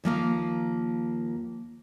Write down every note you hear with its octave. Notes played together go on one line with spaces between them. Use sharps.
D#2 F3 A#3 F5